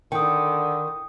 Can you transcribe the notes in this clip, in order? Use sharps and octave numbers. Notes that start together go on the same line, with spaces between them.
D3 D#3 G5 D#6